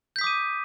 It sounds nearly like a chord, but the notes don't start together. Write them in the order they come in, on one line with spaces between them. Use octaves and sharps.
G6 B6 D#6 D6 D#7